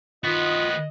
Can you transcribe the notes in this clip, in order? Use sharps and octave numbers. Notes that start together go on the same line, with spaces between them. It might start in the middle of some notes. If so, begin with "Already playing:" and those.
D#3 B3 F4 F#4 D#5